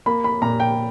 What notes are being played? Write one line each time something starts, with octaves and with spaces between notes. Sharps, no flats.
A#3 B5
B5
A#2 A#5
G5